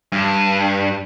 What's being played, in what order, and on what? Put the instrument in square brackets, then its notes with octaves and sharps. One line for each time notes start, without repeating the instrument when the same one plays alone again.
[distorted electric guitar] G2